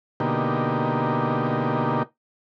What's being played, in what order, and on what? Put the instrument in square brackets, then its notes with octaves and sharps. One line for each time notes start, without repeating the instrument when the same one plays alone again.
[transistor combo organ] B2 D3 A#3 D#4 G4